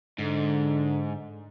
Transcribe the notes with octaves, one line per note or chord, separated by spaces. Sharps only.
G#2 D3